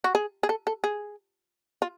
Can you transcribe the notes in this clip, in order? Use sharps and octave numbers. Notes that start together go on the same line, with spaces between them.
F#4
G#4
G#4
A4
A4
G#4
F4